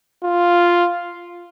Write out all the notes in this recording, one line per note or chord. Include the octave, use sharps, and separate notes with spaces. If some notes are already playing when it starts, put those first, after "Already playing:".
F4